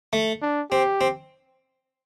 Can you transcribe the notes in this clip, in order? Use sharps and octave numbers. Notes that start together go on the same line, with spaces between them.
A3
D4
C4 G4
C4